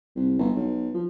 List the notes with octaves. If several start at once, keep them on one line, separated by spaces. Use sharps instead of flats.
C2
G1
B1
F3